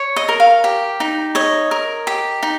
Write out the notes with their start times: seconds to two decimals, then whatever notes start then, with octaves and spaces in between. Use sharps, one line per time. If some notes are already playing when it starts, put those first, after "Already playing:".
Already playing: C#5
0.16 D#5
0.29 A#4
0.40 F5
0.64 G4
1.00 D#4
1.35 C#5 D#5
1.71 A#4
2.07 G4
2.43 D#4